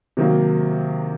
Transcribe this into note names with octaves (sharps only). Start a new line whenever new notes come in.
C3 D#3 F#3 A#3